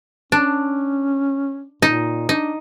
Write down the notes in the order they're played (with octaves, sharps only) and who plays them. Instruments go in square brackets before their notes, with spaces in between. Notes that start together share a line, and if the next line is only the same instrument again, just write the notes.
[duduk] C#4 [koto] D4
[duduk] A#2 [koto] D#4
[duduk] D4 [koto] D#4